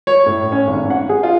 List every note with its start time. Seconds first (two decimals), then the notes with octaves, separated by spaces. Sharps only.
0.07 C#5
0.26 A2
0.52 C#4
0.68 G#1
0.90 F#5
1.09 G#4
1.23 F4